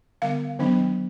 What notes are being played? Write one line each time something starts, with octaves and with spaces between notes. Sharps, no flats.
D3 G3 B3 F5
D#3 F#3 B3 D4